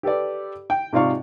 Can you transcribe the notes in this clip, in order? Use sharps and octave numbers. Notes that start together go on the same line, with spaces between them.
G4 A4 B4 D5
G5
G#2 C3 F4 D5 F5 C#6